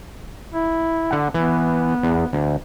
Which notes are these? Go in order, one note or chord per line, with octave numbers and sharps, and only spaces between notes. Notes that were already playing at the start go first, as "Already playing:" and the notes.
E4
D3 F#5
E3 B3
E2
D2